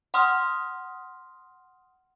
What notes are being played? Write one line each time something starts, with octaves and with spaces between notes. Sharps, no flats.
F#5 C6 D#6 F6